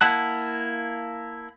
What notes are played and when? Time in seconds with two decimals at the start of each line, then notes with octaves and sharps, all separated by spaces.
0.01 A#3 E4 F#5 A5 F#6